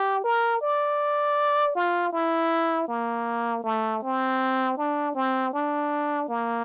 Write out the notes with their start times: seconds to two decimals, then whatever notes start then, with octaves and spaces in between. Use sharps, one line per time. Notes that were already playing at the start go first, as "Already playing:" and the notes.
Already playing: G4
0.24 A#4
0.61 D5
1.75 F4
2.12 E4
2.88 A#3
3.64 A3
4.02 C4
4.77 D4
5.15 C4
5.53 D4
6.29 A#3